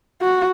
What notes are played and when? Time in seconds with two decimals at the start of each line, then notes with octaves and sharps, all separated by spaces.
0.22 F#4